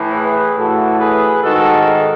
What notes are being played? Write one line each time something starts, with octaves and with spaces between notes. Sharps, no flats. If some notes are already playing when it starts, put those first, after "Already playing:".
Already playing: A2 E3
G#4 B4
A2 E3 F#4 A4
G#4 B4
G#2 D#3 F#4 A4